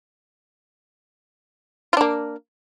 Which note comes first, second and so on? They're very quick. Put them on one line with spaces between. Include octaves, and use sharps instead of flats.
F4 D4 A#3